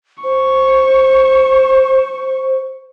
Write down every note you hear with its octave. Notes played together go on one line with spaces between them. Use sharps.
C5 C#6